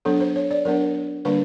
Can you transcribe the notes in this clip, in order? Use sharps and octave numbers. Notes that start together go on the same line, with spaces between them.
F#3 B3 D4 A4
C5
C#5
D5
F#3 B3 D4 A#4
D3 G3 A#3 D4 B4